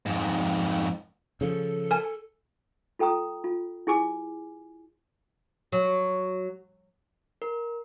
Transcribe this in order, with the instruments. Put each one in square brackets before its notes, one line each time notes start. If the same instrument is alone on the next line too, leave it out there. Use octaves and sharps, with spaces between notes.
[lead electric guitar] F2 G#2
[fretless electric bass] C#3 F3 [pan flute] A4
[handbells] A#4 G#5 A5
[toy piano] F4 A4 G5 A#5 D#6
F4
E4 G#4 G#5 D6
[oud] F#3
[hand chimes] A#4